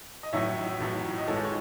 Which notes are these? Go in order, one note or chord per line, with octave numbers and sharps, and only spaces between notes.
D#5
A1 A2 F#3 C#5 E5
A1 A2 F#3
D#5
A1 A2 E3 G#3 A4 C#5
C#5